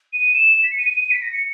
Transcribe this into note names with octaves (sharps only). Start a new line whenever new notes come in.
D#7
E7
B6
C#7
D#7
D#7
D#7
B6
A#6
C#7